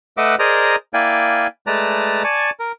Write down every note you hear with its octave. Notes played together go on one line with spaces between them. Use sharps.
A3 B4 D#5 E5 F#5 D6
G#4 A#4 C5 D5 D#5 A#5
A#3 E4 D5 F5 G5 G#5
G#3 A3 B4 D5 A5 A#5
D5 G#5 A5 C#6
A#4